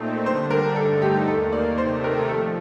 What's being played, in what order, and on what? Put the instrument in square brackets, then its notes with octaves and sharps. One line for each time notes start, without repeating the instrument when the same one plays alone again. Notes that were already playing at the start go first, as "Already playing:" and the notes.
Already playing: [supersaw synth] A#2 A3 C4 D#4
[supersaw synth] D3 G3 D4 [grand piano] C5
[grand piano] A#4
[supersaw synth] G2 D3 A3 D#4 [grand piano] A4
[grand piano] G4
[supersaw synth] D#2 D#3 A#3 [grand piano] A4
[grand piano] D5
[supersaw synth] C3 D#3 A3 [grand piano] C5
[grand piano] A#4
[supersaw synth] F3 [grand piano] A4